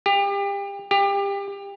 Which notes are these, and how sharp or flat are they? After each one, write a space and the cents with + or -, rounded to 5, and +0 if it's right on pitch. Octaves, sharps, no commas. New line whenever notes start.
G4 +30
G4 +25